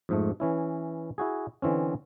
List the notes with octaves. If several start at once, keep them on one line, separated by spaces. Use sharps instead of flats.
F2 G#2 A3
E3 C#4 E4
E4 F#4 G#4
D3 E3 C4 C#4